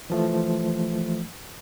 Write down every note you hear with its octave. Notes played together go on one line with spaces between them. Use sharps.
E3 F3 A3